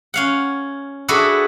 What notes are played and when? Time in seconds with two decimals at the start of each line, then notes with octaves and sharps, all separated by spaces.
0.14 C#4 F5 F#5
1.08 D4 E4 F#4 G#4 A4 B4